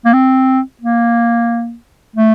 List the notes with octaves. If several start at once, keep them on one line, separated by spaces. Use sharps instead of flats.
A#3
C4
A#3
A3